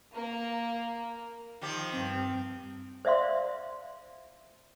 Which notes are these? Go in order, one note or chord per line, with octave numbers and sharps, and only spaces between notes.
A#3
D#3 F3 G4
G2 C4
C5 D5 E5 F5 C6